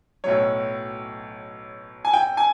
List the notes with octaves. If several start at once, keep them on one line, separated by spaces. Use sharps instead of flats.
B1 A2 F#3 C#5
G#5
G5
G#5